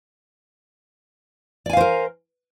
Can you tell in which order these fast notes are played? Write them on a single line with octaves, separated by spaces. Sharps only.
D5 G#5 F5 C5 A#4